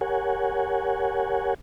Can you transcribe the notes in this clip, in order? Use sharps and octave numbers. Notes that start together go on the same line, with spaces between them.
G4 A#4 C#5 F#5 G#5